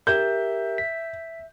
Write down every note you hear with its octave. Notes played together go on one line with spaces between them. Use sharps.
G4 A#4 E5 G6
B6